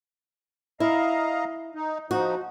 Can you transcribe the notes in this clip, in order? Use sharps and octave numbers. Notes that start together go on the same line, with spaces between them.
E4 D#5 F5 A#5
D#4
F3 D#4 F#4